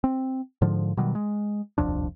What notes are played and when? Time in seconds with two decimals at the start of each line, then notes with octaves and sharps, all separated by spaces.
0.04 C4
0.62 G#2 D3 F3
0.97 B2 D#3 F#3 G3
1.15 G#3
1.78 D#1 C2 F2 D4